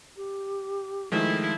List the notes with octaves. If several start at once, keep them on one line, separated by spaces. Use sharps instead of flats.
G4
D#3 F3 G#3 A3 E4